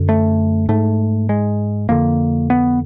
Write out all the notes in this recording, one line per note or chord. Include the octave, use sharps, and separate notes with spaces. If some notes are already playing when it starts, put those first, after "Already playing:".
Already playing: F#2 D3
A3
G#2 A3
G#3
F2 D3 A#3
B3